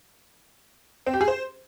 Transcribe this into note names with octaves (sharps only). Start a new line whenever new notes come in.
C4
G4
G#4
C5